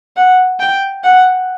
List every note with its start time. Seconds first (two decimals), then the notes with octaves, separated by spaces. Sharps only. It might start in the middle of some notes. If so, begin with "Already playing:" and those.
0.16 F#5
0.60 G5
1.03 F#5